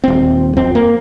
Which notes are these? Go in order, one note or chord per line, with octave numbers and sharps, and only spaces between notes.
D#1 C4
F2 C4
A#3